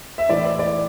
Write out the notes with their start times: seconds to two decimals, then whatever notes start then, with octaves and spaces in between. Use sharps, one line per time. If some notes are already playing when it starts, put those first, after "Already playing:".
0.18 E5
0.29 A2 E3 D5
0.44 D5
0.59 D5